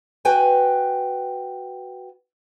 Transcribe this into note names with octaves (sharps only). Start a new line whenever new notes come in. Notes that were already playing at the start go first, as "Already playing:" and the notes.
F#4 B4 G5 G#5